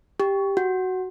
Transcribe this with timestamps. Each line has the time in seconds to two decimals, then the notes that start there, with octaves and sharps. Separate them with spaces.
0.20 G4
0.57 F#4